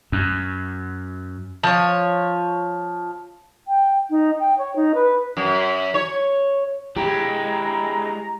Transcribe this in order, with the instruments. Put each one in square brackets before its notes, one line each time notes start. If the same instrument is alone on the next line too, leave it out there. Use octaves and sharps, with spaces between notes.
[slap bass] F#2
[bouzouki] F3 C#5
[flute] G5
D#4
G5
C#5
D#4
B4
[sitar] F#2
C#5
[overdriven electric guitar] G#3 E4 [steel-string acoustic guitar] G4 [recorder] A#5